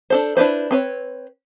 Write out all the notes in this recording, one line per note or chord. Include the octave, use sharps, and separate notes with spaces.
D4 A4 C5
D4 E4 B4 C5
C4 B4 C#5